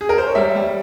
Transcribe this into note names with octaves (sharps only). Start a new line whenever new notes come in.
G#4
A#4
C5
C#5
G3 E5
G3